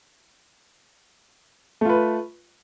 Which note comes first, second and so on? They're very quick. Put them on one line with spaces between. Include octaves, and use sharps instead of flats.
A3 F4 B4